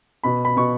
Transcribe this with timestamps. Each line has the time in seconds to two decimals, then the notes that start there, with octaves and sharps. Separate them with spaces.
0.23 B2 B5
0.45 B5
0.57 B2 C#6